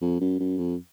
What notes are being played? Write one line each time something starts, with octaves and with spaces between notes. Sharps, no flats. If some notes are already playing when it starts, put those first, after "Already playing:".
F2
F#2
F#2
F2